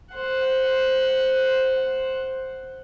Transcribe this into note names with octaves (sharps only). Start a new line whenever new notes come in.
C5 F#5